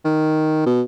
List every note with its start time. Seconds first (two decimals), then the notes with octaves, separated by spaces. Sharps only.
0.05 D#3
0.66 B2